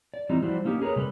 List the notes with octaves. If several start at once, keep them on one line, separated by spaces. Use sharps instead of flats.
D5
E3 G3 C4 D#4
F3 G3 E4 F#4 C5 D5
A#3 C#4 D#4 G4
G#4 A#4 B4 C#5
C3 G3 A4 B4